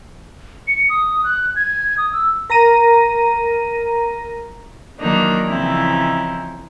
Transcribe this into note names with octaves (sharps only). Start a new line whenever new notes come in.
C#7
D#6
F#6
G#6
D#6
E6
A#4 A#5 A#6 D#7
D#3 E3 F#3 A#3 D4 D#4
C#3 E3 F3 C4 D#4 E4